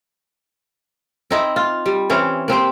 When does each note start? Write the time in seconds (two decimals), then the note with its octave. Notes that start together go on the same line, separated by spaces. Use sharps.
1.31 C4 D#4 E4
1.56 F4
1.86 G3
2.10 E3 C4 C#4
2.48 A#3 C4 G4 C5